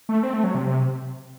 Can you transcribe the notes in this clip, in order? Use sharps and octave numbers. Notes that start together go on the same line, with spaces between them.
A3
C4
A3
F#3
C3